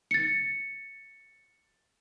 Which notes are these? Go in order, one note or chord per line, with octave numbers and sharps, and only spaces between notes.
A6 C#7